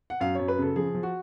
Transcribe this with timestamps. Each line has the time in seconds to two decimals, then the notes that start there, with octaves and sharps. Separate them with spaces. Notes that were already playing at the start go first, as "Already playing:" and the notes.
0.10 F#5
0.21 F#2 F5
0.35 F#2 C#5
0.48 B4
0.58 C#3 A4
0.76 F3 G#4
0.94 F3
1.03 F#4